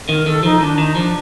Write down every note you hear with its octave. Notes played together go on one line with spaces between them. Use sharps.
D#3 A#4
D#3 A4
F3 D#4
D#3 D4
D#3 D#4
F3 D4